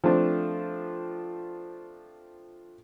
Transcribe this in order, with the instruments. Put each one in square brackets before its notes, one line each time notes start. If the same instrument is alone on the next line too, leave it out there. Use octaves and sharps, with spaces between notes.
[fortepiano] F3 A3 C4 D4